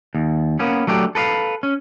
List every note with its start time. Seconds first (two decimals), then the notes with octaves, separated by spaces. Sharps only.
0.15 D#2
0.59 A#3 B3 C#4
0.87 F#3 A3 D4 G4
1.15 A4 B4 D#5 F5
1.63 C#4